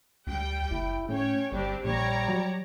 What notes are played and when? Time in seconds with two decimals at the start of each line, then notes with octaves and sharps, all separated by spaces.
0.27 D2 G3 G5
0.71 F#1 E4
1.09 A2 C#4 C#5 G5
1.52 G1 G3 C4 D4 G4
1.84 A#1 G3 C#5 D5 A#5
2.28 F#3